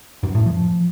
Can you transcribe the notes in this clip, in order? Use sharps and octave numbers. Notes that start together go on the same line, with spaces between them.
F#2
A2
F3